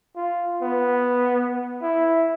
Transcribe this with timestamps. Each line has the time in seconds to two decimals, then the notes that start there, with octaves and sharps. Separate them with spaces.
0.16 F4
0.61 B3
1.82 E4